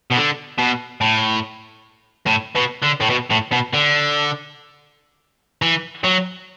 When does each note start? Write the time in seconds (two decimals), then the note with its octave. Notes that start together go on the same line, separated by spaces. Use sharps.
0.11 B2
0.18 D3
0.59 B2
1.01 A2
2.26 A2
2.55 B2
2.82 D3
3.01 A2
3.10 B2
3.31 A2
3.52 B2
3.74 D3
5.62 E3
6.04 F#3